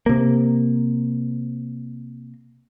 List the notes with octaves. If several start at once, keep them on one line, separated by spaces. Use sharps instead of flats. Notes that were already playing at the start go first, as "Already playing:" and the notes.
C3 A#3